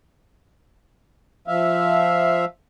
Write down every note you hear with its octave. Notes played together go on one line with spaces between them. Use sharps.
F3 E5 F5